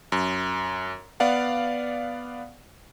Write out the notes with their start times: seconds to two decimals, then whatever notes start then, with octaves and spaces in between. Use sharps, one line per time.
0.12 F#2
1.20 B3 D5 F5 F#5